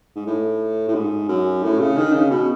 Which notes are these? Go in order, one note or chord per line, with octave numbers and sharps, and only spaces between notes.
G#2
A2
A2
G#2
F#2
A2
C#3
D#3
C#3
B2